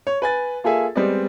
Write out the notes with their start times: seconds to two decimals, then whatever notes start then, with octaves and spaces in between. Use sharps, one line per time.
0.07 C#5
0.22 B4 G#5 A6
0.64 A#3 F4 G#4 A4 E5 G#5
0.95 G3 G#3 B3 C4 D5 D#5